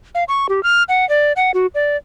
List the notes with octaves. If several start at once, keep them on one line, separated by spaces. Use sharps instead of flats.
F5
C#6
G4
F6
F#5
D5
F#5
F#4
D5